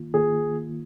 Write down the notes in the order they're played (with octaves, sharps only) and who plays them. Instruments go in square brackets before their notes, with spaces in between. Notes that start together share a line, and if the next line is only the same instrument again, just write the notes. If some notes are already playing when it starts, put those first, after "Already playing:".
Already playing: [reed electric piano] D#3 A#3 F4
[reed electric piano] D#3 A#3 F4 [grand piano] G#4